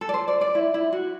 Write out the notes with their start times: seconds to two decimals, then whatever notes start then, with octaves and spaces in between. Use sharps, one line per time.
0.01 A4
0.09 D5
0.14 C5
0.28 D5
0.41 D5
0.55 E4
0.74 E4
0.93 F#4